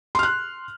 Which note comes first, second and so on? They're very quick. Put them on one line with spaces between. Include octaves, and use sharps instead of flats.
C6 F6 F#6